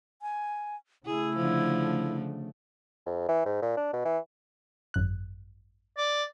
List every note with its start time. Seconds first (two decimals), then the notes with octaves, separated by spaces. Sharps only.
0.22 G#5
1.06 C#3 A3 E4 G#4
1.36 D3 F3
3.06 F2
3.29 E3
3.45 G#2
3.62 A#2
3.77 D4
3.93 B2
4.05 E3
4.94 G#1 F#2 F#6
5.97 D5